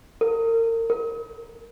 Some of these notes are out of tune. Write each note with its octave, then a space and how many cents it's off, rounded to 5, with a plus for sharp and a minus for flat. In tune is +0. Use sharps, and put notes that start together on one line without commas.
A#4 -35
A#4 -15